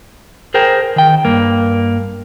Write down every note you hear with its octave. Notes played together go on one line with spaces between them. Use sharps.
G#4 A#4 C5 G5
D#3 G5
G2 A#3